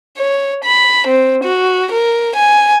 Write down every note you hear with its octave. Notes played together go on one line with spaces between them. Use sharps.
C#5
B5
C4
F#4
A#4
G#5